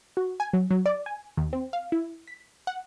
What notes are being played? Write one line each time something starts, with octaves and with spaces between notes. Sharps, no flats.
F#4
G#5
F#3
F#3
D5
G#5
D#2
C4
F5
E4
B6
F#5